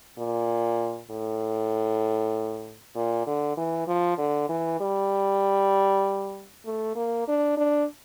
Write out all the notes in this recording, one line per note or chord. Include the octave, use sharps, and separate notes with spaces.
A#2
A2
A#2
D3
E3
F3
D3
E3
G3
A3
A#3
D4
D4